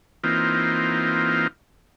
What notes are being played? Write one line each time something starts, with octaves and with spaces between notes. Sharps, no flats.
E3 A#3 C4 D#4 F4